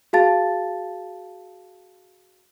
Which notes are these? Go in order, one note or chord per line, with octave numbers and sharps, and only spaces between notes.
F#4 G#4 F5 A5 A6